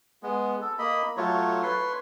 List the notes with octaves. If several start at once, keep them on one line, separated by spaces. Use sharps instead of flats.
G#3 B3
A4
A#3 D#5 B5
F#3 A3 F4 C#5
B4 C#5 C6